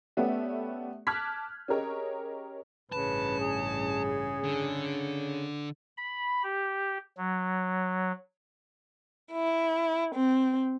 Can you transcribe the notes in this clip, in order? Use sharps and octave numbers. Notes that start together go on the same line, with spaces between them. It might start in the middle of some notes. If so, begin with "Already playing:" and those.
A3 B3 C#4 G4 D5 E5
A5 D6 F6 F#6 G#6 B6
C#4 G4 G#4 A#4 C#5 D#5
A1 G2 C#3 B4 A5
G#4
D3
B5
G4
F#3
E4
C4